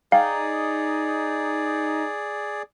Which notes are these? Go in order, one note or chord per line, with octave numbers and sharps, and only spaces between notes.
D#4 G#4 D5 F5 G5